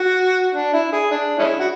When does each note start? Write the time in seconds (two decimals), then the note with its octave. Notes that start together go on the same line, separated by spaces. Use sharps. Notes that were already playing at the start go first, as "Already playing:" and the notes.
Already playing: F#4
0.55 D4
0.73 E4
0.92 G#4
1.11 D4
1.39 G#3 C#4 E4
1.59 F#4